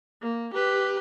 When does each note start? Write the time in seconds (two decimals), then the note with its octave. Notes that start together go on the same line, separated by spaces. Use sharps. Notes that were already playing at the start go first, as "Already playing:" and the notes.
0.22 A#3
0.54 G4 B4